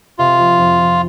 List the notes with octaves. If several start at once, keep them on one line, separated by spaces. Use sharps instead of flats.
C3 F4
F3
F2
F3